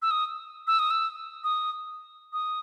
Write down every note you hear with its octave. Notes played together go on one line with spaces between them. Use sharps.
E6
D#6
E6
D#6
E6
D#6
D#6